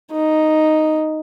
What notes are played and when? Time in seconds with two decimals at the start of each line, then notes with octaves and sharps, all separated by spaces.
0.12 D#4